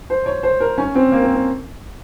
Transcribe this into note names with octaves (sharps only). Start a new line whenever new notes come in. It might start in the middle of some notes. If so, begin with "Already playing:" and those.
C5
C#5
C5
A#4
C#4
C4
A#3
C4
C4